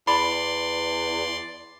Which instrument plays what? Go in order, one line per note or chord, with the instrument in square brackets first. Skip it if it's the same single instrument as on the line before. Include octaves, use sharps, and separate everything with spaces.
[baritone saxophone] E2 [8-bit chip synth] D5 C6 [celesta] B5